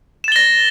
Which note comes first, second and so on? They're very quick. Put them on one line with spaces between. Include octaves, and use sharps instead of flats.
E7 A6 G7 A#6